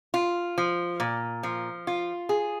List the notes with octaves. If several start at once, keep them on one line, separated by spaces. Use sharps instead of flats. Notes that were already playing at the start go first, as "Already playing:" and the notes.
F4
F3
A#2
F3
F4
G#4